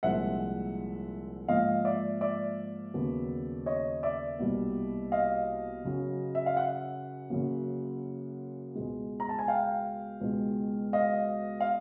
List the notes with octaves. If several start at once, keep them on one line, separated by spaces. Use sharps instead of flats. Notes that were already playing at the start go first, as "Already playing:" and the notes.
C2 A#2 F3 G#3 C4 E5 F#5
G#2 F3 A#3 D#5 F5
D5 E5
D5 E5
D#2 C#3 F#3 B3
C#5 D#5
D5 E5
C2 B2 G3 A#3
D#5 F5
F#2 C#3 F#3
E5
F5
E5 F#5
F#2 C#3 F#3 A#3
C#2 B2 G#3
A#5
A5
G#5
F5 G5
C#2 B2 G#3
D#5 F5
F5